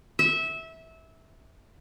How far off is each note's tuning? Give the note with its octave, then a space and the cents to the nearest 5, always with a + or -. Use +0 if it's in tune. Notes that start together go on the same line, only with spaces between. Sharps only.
E5 -20